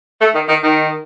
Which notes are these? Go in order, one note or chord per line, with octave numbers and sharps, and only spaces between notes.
A3
D#3
D#3
D#3